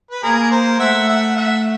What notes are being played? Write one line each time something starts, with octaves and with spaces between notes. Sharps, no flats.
B4
A#3 G#4 A#4
A#4 C5
A3 E5 F#5
E5 F#5
E5 F#5